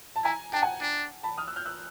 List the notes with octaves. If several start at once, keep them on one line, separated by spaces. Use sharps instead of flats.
A5
E4 G#5 A#5
D4 G5 A5
F#5 G#5
D4
A5 B5
D#6 F6
E6 F#6
F6 G6
E6 F#6